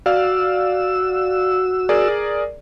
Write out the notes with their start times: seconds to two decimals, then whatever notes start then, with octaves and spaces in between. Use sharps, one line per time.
0.06 F#4 D5 F5 E6 F6
1.89 G#4 A#4 D5